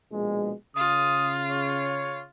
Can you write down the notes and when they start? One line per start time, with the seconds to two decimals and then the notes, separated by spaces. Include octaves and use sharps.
0.12 A#1 B2 G#3
0.76 C#3 F4 D#6
1.50 C#5